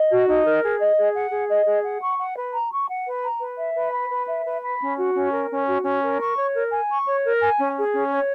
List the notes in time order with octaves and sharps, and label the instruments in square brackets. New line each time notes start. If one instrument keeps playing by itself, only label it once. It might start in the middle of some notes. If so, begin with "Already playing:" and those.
Already playing: [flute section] D#5
F#4
D#4
A#4
G#4
D#5
G#4
F#5
G#4
D#5
G#4
F#5
C#6
F#5
B4
A#5
C#6
F#5
B4
A#5
B4
E5
B4
B5
B4
E5
B4
B5
C#4
F#4
C#4
A#4
C#4
F#4
C#4
A#4
C#6
C#5
A#4
G#5
C#6
C#5
A#4
G#5
C#4
G#4
C#4
C#5